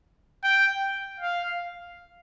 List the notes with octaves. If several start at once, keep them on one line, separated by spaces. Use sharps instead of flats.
G5
F5